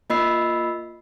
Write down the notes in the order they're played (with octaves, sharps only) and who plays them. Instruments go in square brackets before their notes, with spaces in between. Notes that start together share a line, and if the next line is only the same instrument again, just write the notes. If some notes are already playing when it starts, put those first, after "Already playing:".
[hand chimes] A#3 F4 D#5 B5 E6 C7